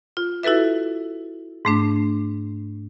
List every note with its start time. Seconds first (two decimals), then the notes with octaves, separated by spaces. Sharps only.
0.17 F4
0.43 E4 F#4 A4 B4 E5
1.65 G#2 A3 D4